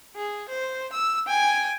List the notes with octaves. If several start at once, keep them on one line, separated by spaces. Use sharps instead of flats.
G#4
C5
E6
G5 G#5